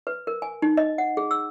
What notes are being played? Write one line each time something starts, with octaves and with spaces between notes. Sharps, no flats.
B4
A#4
G#5
D#4
D#5
F#5
G#4
E6